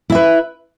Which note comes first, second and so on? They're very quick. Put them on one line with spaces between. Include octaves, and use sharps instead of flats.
E4 E5 B4